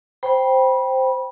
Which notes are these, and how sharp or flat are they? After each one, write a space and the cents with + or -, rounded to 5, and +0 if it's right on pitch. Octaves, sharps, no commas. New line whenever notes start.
C5 +0 G5 +0 B5 -25